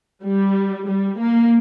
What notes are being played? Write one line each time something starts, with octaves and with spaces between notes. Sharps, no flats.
G3
G3
A#3